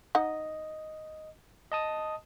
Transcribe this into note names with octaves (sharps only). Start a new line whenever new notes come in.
D#4 D#5 F#5
D#5 A5 D#6